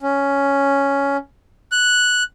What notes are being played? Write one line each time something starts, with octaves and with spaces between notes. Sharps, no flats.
C#4
F#6